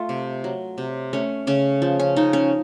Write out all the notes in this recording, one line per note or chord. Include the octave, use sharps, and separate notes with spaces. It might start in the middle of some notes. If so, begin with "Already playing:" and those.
Already playing: A3 F4
C3
F#3
C3
A3 C#4
C#3 C#4
F3
C#4
C#3 D#4
C#4